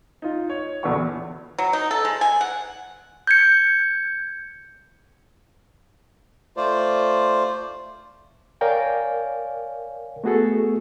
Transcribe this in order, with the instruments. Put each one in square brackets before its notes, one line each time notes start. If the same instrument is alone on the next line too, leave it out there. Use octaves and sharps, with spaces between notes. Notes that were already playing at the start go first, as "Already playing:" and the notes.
[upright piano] D#4 F4
C#5
A#1 E2 D3 B3 F#4 C#6
[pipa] F#3
D#4
A4
G#3
G#5
F#5
[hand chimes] G6 G#6 C#7
[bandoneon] A3 F4 C5 D5
[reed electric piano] A#4 C#5 D5 F5 G5 G#5
A3 B3 F#4 G#4 A4